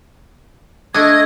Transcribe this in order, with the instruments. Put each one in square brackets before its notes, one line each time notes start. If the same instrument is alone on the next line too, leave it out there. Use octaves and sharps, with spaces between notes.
[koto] A3 D4 [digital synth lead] D#5 [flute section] G#6